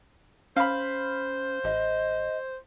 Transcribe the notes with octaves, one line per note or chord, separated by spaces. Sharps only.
C#4 C5 F5 B5
A1 D#5